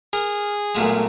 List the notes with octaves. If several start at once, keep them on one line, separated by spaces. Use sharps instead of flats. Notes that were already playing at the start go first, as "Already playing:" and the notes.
G#4 A#4
B1 A#2 G#3 A3 A#4